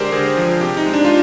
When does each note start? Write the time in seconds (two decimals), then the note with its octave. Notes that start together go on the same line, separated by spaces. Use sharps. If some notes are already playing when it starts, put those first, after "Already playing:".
Already playing: D3 G#3 G4 A#4 C5 D5
0.12 D3 G#4
0.37 F3
0.61 C3 G4
0.77 D#4
0.86 G#3
0.93 D4
1.05 F4